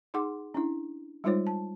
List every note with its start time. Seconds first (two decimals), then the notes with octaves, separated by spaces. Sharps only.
0.14 D#4 G#4 F#5 C6 D6
0.54 C#4 D4 E4
1.24 G3 G#3 D#4 F4 C5 C#5
1.47 A5